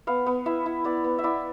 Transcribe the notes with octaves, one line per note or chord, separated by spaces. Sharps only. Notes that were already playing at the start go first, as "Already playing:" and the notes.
B3 F5
B3
E4 E5
E4
B3 D5
B3
E5
E4 D5